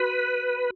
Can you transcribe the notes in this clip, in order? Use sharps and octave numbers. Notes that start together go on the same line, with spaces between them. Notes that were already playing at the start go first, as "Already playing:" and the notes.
Already playing: F#4 B4